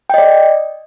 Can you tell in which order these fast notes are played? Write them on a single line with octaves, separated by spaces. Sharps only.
G5 D#5 D5